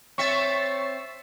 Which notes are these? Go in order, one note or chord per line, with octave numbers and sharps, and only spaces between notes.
C4 C#5 E5 C#6 A6